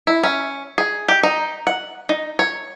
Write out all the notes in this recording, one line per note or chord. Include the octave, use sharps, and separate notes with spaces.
E4
C#4
G#4
G4
D#4
F#5
D#4
C#5